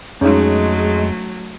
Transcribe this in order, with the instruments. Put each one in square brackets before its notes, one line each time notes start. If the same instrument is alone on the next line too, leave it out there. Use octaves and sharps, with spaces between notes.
[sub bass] F2 [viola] F#3 A3 [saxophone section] G#3 [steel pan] C#4 D#4